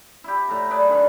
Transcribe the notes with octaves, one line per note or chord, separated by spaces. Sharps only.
E4 G4
A2 A4 A#5
G#4 B4 D5
D3 D#3 A#4 B4